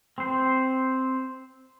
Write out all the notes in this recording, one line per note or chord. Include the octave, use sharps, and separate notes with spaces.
C4 C5